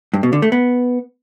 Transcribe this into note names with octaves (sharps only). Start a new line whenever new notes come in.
G2
B2
D3
A3
B3